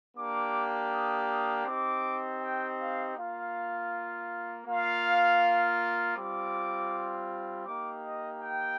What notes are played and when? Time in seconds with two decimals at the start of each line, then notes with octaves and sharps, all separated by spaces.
0.16 A#3 D4 G4 D6
0.91 D#6
1.28 D#6
1.66 C4 D#4 G4 D6
2.41 G5
2.78 F5
3.16 A#3 F4 F5
4.66 A#3 F4 F5
6.16 G3 C4 F4 D6
7.65 A#3 D#4 G4 D6
8.03 D#5
8.40 G5